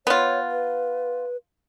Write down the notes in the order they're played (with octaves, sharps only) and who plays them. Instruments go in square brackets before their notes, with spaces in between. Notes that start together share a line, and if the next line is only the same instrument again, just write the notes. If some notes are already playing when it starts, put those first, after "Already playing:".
[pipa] B3 F4 [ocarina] C#5
[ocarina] B4